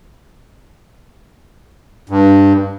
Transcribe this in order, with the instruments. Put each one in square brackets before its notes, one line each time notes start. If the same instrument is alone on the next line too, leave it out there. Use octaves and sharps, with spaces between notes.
[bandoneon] G2